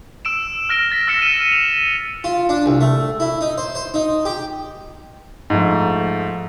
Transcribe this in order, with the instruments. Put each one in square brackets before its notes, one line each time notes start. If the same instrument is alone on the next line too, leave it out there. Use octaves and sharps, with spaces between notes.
[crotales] E6 D7 E7
F6 A#6 D7 G7
A6 B6
E6 F6 A#6 C#7 E7
B6 D#7 E7
F7
[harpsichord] F4
D4
C2
A3
E4
D#4
C5
C5
D#4
G4
[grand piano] G#2 F3 A3